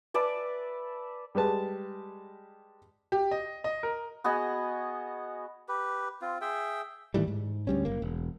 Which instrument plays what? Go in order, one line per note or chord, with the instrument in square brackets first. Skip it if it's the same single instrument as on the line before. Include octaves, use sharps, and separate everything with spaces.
[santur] B4 D5 E5 A5
[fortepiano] G3 G#3 B4 A5
[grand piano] G4
D#5
D#5
A#4
[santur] B3 F#4 G#4 D#5
[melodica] G4 B4
C4 F4
G#4 E5 G5
[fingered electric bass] A2 D#3 E3 G3
G#2
D2 G3 C#4
F#1 A#3
E1